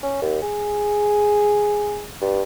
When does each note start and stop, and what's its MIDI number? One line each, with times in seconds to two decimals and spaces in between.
0.03 0.21 61
0.22 0.38 39
0.42 2.04 68
2.21 2.42 43